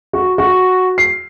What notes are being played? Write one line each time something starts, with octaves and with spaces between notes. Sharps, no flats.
F#4
F#4
C7